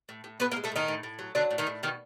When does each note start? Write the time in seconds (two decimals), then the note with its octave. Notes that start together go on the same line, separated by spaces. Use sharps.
0.09 A2
0.24 A2
0.40 A2 B3 B4
0.51 A#3 A#4
0.56 G#3
0.64 A3 A4
0.72 A2 D#3 D#4
0.88 A2
1.03 A2
1.19 F#3
1.35 D3 F#3 D4
1.51 A2
1.58 D#3 D#4
1.67 A2
1.83 B2 D#3 D#4